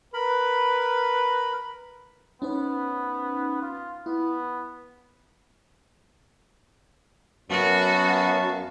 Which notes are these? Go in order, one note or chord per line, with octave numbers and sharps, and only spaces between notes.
A#4 B4 B5
B3 C#4 D#4 C5
F4
B3 E4
F#2 B3 F#4 F5 A5 C#6